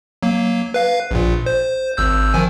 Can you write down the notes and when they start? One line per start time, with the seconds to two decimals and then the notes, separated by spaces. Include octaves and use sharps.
0.23 F#3 A#3
0.74 B4 F5
1.11 A#1 A#2
1.46 C5
1.97 G#1 E6 G6
2.34 D#3 F3 G#5